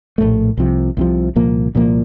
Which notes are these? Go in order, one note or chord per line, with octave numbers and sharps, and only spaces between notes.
A#1 A2 A3
C2 C3 F3
C2 C3 F3
C2 A#2 F3 A#3
C2 A#2 F3 A#3